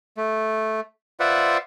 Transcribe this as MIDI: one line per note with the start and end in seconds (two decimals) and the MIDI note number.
0.17 0.80 57
1.20 1.57 65
1.20 1.57 71
1.20 1.57 72
1.20 1.57 74
1.20 1.57 76
1.20 1.57 78